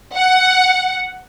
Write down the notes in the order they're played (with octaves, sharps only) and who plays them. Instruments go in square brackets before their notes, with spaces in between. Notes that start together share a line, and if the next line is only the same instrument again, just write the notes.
[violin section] F#5